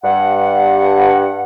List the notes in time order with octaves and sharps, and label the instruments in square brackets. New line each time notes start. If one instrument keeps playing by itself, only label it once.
[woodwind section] G2 F#5